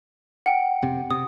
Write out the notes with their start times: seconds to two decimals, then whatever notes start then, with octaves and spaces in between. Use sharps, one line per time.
0.46 F#5 G5
0.82 F1 C3
1.11 C3 D#6